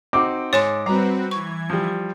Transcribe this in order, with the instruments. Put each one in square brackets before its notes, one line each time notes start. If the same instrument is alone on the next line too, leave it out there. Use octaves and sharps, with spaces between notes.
[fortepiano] C4 D#4 F#4 [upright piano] D6
[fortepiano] G#2 [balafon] C#5 G#5 C6
[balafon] G3 [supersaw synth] C4 F#4 B4 [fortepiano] A#5
[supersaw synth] E3 G#6 [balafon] C#6
[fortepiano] F3 G3